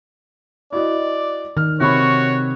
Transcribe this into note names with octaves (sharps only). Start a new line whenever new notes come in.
E4 F#4 D5 D#5
D#3 F6
C3 F#4 C#5 B5